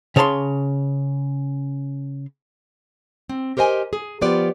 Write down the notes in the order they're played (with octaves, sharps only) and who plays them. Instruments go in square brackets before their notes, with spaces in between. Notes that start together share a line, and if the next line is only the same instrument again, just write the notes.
[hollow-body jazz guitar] C#3 C#5 A5 B5 C6
[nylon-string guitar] C4
G4 A#4 C5 D#5 G#5
G#4
F3 B3 F4 G4 B4 D5